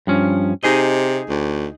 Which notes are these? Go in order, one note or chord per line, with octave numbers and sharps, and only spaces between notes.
G2 F3 C#4
C3 D#4 G#4 D#5
D2